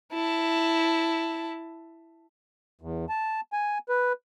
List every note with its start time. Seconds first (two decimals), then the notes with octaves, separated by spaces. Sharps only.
0.12 E4 A5
2.81 E2
3.09 A5
3.53 G#5
3.89 B4